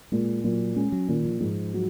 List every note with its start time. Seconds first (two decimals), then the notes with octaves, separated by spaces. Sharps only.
0.12 A#2 G#3
0.44 A#2 F#3
0.76 G#3 C#4
0.92 F#3
1.08 A#2 D#3
1.25 F3
1.40 G#2 F3
1.74 F#3